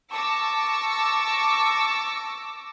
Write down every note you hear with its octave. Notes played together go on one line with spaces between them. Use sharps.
A5 C#6 D6 E6 A#6